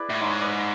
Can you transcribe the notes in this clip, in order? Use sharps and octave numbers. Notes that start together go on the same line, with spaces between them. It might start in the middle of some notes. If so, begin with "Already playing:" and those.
Already playing: E4 G#4 B4 D5
A2
G#2 C#5 E5
B4 D5